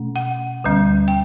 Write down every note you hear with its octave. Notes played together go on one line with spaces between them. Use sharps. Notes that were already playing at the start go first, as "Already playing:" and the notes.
Already playing: B2 A3 C#4
F#5
D2 D3 G3 C#4
G5